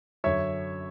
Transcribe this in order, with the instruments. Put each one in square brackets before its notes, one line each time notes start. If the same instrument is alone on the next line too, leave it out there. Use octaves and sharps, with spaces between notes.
[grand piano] F#2 D3 F#3 C#5 E5